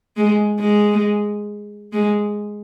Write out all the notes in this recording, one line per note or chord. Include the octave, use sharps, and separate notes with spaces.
G#3
G#3
G#3